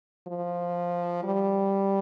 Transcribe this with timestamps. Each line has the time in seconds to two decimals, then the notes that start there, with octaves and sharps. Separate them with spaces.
0.27 F3
1.24 G3